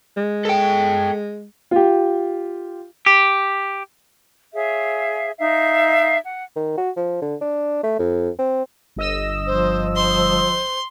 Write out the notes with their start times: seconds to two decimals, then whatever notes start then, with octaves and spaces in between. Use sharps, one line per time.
0.17 G#3
0.45 A4 G5
1.71 F4 G4
3.06 G4
4.54 G#4 C#5 E5 F5
5.39 D#4 E5 F5
6.24 F#5
6.56 D#3
6.78 F#4
6.96 F3
7.22 D3
7.41 D4
7.83 A3
7.99 F2
8.39 C4
8.96 G1 D#5 E6
9.47 F3 C5
9.96 C5 C6